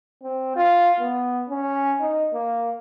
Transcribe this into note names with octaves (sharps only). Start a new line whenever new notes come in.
C4
F4
B3
C#4
D#4
A#3